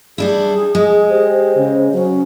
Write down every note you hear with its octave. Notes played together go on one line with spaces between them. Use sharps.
G3 D4 E4 G#4
G#3
G4 C5
C#3
F#3 C#4